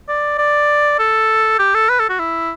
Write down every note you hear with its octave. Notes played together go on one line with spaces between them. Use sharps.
D5
D5
A4
G4
A4
B4
A4
F#4
E4